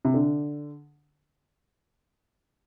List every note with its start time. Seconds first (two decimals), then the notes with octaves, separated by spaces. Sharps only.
0.05 C3
0.14 D3